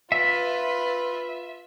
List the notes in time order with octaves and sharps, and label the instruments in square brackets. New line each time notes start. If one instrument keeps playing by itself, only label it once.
[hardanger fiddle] F4 B4 [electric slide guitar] E5